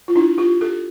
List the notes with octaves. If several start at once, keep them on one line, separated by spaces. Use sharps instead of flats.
F4
D4 E4
F4 G4
G4 A4